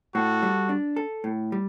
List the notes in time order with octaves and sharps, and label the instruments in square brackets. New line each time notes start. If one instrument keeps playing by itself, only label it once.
[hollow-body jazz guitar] A2 [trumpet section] F#4 A4
[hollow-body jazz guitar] G3
D4
A4
A2
G3